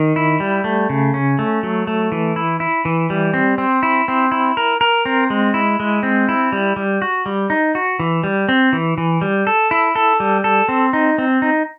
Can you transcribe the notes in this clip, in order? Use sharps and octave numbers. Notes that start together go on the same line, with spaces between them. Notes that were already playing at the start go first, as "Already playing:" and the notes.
Already playing: D#3
E4
G3
A3
C#3
C#4
A3
F#3
A3
E3
E4
E4
E3
G3
C4
C4
E4
C4
E4
A#4
A#4
C4
G#3
E4
G#3
C4
E4
G3
G3
F#4
G3
D#4
F#4
E3
G3
C4
E3
E3
G3
A4
E4
A4
G3
A4
C4
D#4
C4
D#4